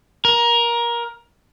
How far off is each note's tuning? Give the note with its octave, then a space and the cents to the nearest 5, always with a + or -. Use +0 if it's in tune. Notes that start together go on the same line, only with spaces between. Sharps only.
A#4 +20